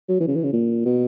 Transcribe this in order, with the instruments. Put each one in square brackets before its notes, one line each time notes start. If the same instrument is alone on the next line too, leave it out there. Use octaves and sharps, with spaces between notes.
[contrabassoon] F#3
E3
C#3
E3
C#3
A#2
B2